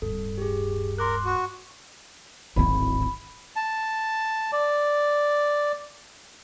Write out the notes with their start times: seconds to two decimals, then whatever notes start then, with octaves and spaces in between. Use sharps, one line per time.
0.02 D1 G2 A4
0.38 G4 G#4
0.98 A#4 C6 D6 F#6
1.25 F#4
2.56 D1 G#1 C4 E4 B5
3.56 A5
4.52 D5